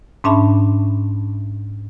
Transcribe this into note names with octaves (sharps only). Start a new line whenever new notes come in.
G#2 C#4 D4 E5 A5 B5